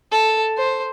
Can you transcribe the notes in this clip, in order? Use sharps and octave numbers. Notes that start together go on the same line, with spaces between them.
A4
C5